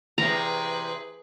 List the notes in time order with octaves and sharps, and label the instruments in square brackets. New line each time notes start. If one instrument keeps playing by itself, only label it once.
[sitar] E2 C3 [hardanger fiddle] G#4 B4 [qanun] A#5